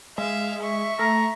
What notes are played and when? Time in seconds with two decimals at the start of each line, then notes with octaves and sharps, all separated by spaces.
0.18 G#3 E5 F5
0.62 E5 C#6
0.99 A3 A#5